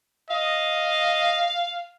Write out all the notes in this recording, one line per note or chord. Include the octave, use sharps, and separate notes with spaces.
D#5 F5